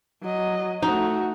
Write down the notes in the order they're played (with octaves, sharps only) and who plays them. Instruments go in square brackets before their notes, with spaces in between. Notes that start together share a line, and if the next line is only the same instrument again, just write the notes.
[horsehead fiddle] F#3 D#5
[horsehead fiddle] A3 F#4 [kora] D#4